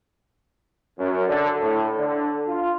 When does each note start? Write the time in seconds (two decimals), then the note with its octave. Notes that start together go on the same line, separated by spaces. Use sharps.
0.98 F#2
1.28 D3
1.60 A2
1.97 D3
2.48 F4